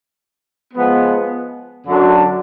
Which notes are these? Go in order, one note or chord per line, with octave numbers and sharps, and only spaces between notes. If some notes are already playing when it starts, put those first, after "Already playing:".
F3 G#3 B3
F#2 D3 F#3 D4